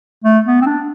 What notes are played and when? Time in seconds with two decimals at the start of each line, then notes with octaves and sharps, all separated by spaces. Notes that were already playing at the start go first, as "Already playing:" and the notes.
0.24 A3
0.46 B3
0.61 C4
0.66 D4